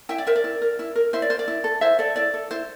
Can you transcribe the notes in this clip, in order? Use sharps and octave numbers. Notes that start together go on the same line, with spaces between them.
E4 E5 G5
D5
A#4 C5 E5
D5
E4
A#4
E4
A#4
E4 C5 E5
D5
A#4 C5
D5
E4
A4
E4 C5 E5
A4 D5
E4 D5
A4
E4 C5